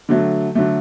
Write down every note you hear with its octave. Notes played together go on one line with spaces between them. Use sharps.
D3 F#3 A3
D3 F#3 A3